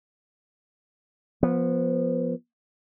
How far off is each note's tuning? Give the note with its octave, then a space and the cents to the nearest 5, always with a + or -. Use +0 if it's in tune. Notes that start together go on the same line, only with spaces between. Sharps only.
F3 +0 B3 -20